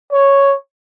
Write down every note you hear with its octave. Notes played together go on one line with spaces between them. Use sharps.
C#5